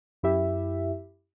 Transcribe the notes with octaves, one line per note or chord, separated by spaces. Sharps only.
F#2 E4 G4 E5